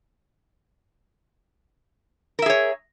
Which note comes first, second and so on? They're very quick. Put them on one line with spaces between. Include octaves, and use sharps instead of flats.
A#4 E5 G#4 C#5